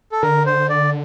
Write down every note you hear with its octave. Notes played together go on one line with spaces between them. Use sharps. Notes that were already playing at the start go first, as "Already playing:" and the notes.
A4
D3 A#4
C5
D5